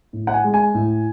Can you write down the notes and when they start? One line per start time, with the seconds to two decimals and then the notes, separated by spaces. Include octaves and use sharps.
0.13 A2
0.27 F#5
0.33 G#5
0.44 G#3
0.54 G#5
0.74 A2